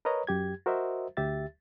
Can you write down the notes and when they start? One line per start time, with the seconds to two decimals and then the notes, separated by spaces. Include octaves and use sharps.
0.05 A#4 B4 C#5 D#5 A#5
0.27 F#2 G4 G#6
0.66 F#4 A#4 C5 D#5 E5
1.17 D2 G4 E5 A6